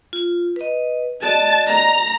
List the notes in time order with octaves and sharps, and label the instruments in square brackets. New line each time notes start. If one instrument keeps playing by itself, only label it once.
[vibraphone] F4
B4 D#5
[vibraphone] F#4 D5 D#5 [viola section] A5
[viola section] A#5